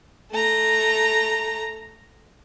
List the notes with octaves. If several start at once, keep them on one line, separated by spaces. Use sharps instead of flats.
A3 A#5